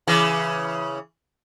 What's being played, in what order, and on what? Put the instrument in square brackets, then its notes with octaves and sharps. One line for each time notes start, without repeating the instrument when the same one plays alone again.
[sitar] C#3 E3